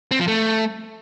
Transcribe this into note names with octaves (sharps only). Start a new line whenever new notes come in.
C4
F3
A3